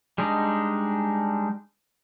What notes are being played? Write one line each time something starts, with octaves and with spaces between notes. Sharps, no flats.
G3 G#3 D4 D#4